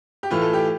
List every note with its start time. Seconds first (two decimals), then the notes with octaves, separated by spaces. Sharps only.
0.23 G4
0.31 A2 E3 A3 F4
0.42 A4
0.53 G4